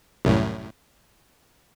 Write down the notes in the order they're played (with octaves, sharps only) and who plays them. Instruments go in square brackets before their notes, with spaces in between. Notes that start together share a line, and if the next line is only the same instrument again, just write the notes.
[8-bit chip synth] C2 F#2 A2